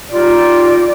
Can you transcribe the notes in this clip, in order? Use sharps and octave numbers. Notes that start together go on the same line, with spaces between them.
G3 D#4 F4 D5